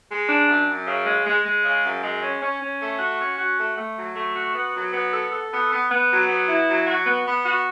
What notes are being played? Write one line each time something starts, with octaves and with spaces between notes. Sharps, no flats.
G#3
D4
F#2
F#2
C#3
G#3
G#3
G#3
C#3
F#2
G#3
C#4
C#4
C#4
A3
F#4
C#4
F#4
A3
A3
F#3
A3
F#4
B3
F#3
B3
A4
A4
B3
B3
B3
F#3
B3
E4
F#3
F#4
B3
B3
F#4